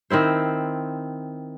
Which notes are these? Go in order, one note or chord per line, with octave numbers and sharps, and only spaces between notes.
D#3 C4 E4 C5